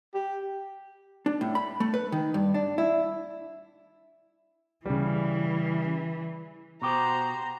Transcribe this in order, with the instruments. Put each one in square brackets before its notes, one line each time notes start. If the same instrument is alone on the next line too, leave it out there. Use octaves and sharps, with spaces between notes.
[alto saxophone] G4
[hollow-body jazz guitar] D4
A2
B5
A3
B4
D#3
G2
D4
E4
[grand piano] C#3 G3 [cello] E3
[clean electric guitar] B2 G4 [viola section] F#4 C5 [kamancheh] A#5